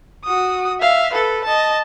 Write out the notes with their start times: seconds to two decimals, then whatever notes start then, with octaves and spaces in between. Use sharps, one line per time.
0.25 F#4 D#6
0.80 E5 F5
1.13 A4 B4
1.45 D#5 A5